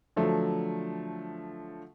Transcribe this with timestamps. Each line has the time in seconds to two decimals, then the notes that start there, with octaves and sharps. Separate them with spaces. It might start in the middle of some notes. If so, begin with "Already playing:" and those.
0.16 D3 F3 F#3 A3